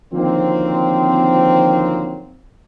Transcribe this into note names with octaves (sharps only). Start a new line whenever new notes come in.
D3 D#3 F3 F#3 A#3 C4